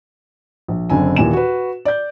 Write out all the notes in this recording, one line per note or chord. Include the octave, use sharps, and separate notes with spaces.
A#1
F#1 D3 C4 G#5
D#2 A#2 E3 G#5 E7
F#4 B4
D5 G6